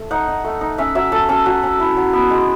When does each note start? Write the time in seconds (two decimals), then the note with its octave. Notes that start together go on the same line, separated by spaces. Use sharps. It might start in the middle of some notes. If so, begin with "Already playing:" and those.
Already playing: A3
0.11 D#4 F#5
0.28 D#4
0.44 A3
0.61 D#4
0.78 C#4 E5
0.95 F#3 E5
1.12 F#3 A4
1.29 C#4 A4
1.46 F#3 F#4
1.63 C#4
1.80 E4
1.97 F#3
2.13 B3
2.30 G#3